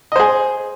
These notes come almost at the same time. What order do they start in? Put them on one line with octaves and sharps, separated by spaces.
D#5 C5 G#4